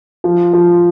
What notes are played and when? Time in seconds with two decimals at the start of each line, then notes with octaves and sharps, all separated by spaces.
0.24 F3
0.53 F3